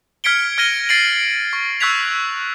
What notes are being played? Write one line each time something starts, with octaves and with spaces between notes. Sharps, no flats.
F6 G#6 B6 C#7 D7 G7
F6 G#6 A#6 D7 D#7 G7
A6 C7 D7 F#7
C#6
C#6 E6 F#6 G#6 B6 F7